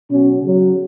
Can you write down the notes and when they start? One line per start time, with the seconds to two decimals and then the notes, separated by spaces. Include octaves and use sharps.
0.10 B2 F#3 C#4
0.42 C#3 F#3